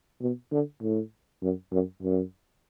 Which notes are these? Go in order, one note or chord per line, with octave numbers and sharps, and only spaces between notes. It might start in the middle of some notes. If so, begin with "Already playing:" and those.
B2
D3
A2
F#2
F#2
F#2